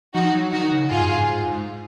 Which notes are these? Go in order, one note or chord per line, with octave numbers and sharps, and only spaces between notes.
F3 D#4 F#4
F#3
D#3 D#4 F#4
C#3
G#2 F4 G#4
F#2
G#2
G#2
G#2